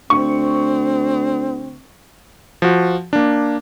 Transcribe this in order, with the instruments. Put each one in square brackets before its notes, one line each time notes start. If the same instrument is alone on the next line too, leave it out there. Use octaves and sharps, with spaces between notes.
[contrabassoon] D2 [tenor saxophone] C4 [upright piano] C#6
[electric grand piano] F3 F#4
A#3 D4